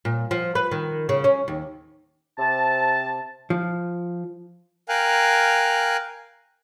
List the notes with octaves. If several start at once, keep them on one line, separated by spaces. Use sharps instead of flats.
A#2
F3
B4
D#3
C#3
C#4
D#2
C3 A5
F3
A#4 F5 G5 G#5 F#6